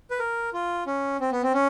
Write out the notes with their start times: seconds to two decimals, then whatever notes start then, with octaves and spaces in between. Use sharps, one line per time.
0.11 B4
0.19 A#4
0.53 F4
0.87 C#4
1.20 C4
1.32 B3
1.43 C4
1.54 C#4